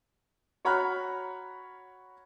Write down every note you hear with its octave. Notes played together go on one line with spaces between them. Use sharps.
F#4 C#5 A#5 B5 F6 F#6